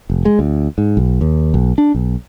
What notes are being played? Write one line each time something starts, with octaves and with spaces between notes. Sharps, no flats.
F1
G#3
D2
G#2
B1
D#2
B1
D4
B1